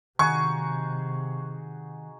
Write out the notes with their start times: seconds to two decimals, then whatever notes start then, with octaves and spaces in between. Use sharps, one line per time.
0.19 C3 D#3 D#4 F#4 G#4 C#6